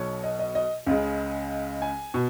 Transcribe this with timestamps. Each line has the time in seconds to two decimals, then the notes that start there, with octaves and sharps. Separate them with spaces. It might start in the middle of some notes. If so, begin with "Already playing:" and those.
Already playing: B1 B2 F#3 C#5
0.23 D#5
0.39 D#5
0.55 D#5
0.86 C#2 C#3 G#3
1.82 G#5
2.14 B2